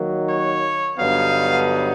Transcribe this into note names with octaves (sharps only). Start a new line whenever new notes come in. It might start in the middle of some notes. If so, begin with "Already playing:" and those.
Already playing: D#3 F#3 A#3
C#5
G2 D3 F#3 B3 D#4 F5